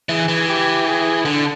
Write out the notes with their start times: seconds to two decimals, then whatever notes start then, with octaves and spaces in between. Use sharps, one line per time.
0.09 E3 G#4
0.28 E3
0.48 G4
0.87 G#4
1.25 D3